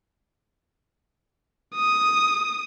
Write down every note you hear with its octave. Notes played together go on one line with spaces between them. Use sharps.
D#6